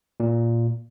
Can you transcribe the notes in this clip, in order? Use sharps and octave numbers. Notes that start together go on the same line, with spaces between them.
A#2